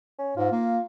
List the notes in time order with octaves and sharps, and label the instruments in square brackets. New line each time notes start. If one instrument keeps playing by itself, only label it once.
[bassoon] C#4
[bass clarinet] G#2 [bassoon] F4
[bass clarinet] A#3